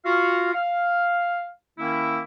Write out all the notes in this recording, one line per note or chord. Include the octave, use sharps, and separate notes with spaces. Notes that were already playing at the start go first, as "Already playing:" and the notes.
F4 F#4 F5
F5
D#3 A#3 C#4 E4